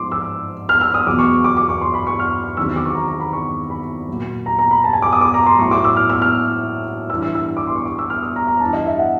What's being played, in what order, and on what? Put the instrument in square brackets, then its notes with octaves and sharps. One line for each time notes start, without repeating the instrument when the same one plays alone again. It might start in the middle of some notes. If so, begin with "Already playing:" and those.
Already playing: [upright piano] G#2 F3 C6 D6
E6
F6
E6
D#6
E2 B2 F#3 D6
C#6
D6
D6
C#6
C6
B5
C#6
F6
E2 C3 D#3 F#3 E6
D6
C#6
A#5
A#5
B5
C#6
B5
A#2 F#3
A#5
A#5
B5
A5
G#5
D6
D#6
D6
A#5
C6
A2 F#3 C#6
D6
E6
F6
E6
F6
G2 E3 E6
E6
E6
D6
C6
C#6
D6
E6
F6
D#6
A#5
A#5
G2 A5
E3
D#5
E5
F#5